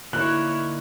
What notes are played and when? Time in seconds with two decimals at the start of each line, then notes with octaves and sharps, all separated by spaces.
0.13 D3 A#3 D#4 E4 C#5 F#6